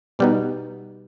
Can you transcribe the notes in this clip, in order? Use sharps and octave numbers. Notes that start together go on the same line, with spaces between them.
B2 G3 B3 D#4